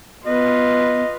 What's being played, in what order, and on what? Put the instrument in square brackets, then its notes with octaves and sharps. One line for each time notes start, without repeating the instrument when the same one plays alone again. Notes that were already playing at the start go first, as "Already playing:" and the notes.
[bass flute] B3 [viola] F4 B4 [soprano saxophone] D#5